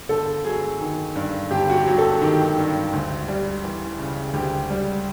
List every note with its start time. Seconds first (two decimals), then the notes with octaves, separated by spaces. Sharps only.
0.09 G1 A4
0.45 F#3 G#4
0.80 D#3
1.16 G2
1.51 G1 G4
1.69 F#4
1.74 G4
1.87 F#3
1.98 A4
2.22 D#3 G4
2.57 G2
2.93 D2
3.28 G3
3.64 E3
3.99 C#3
4.34 D2 G4
4.70 G3